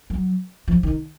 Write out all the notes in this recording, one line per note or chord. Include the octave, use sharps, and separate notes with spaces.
F#3
F3
D#3